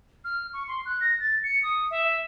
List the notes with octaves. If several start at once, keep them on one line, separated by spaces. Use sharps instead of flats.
F6
C#6
C6
F#6
A#6
A6
C#7
D#6
E5